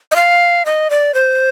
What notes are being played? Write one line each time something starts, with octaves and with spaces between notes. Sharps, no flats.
D#5
F5
D#5
D5
C5